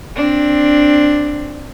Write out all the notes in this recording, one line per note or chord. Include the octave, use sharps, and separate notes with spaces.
C4 D4